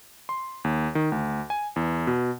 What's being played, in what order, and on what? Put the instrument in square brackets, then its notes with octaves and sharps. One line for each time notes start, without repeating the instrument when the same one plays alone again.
[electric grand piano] C6
D#2
D#3
D2
G#5
E2
B2